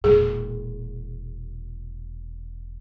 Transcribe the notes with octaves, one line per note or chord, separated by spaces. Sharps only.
E1 A#2 G#4